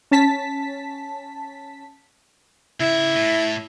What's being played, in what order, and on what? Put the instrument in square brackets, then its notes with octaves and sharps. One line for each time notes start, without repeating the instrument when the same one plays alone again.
[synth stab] C#4 A5 B6
[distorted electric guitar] C#3 E5 [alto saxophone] E4
[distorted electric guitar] A2